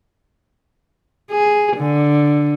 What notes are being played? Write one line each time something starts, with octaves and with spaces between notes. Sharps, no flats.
G#4
D3